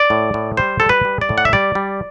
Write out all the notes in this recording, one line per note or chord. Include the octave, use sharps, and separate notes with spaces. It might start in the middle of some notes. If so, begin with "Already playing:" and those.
Already playing: D5
A2
A2
G3 C5
G3 A4
B4
G3
D5
A2
F#5
E5
G3 D5
G3